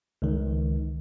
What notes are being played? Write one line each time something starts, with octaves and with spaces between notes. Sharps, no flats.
C#2 D#3